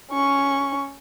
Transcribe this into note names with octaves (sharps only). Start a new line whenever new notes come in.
C#4 C#6